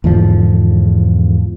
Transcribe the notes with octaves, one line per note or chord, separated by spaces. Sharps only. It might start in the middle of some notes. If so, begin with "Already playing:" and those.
E2 G#2 D3 F3